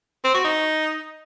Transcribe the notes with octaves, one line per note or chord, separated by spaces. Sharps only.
C4
F#4
D#4